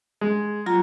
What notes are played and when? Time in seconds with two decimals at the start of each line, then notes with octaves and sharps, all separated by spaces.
0.21 G#3
0.66 F#3 F4 A#5